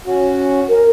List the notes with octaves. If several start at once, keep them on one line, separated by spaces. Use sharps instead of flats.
C#4 F#4
A#4